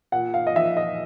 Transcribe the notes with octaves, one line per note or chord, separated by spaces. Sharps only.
A#2 F#5
F5
D#5
F3 E5
D#5